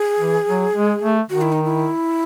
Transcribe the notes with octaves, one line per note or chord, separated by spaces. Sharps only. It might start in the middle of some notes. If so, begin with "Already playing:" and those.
Already playing: G#4
E3
F#3
G#3
A3
D#3 F#4
E4
D#4
E4